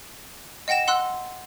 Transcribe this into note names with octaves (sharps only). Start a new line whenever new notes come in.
D#5 F#5 G5 A#6 E7
F#5 C6 E6 F#6